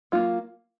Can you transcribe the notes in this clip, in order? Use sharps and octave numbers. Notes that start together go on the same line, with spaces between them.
F#3 A#3 F4